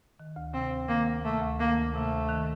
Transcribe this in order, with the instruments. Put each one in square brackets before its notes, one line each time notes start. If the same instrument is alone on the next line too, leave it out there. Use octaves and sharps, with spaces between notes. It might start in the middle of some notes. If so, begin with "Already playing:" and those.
[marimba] D#3
D2
[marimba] C3 [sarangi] C4
[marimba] D2
[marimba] D#3 [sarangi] A#3
[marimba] D2
[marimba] C3 [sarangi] A3
[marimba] D2
[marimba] D#3 [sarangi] A#3
[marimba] D2
[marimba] C3 [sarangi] A3
[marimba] D2
D#3